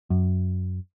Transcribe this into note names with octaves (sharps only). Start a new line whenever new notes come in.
F#2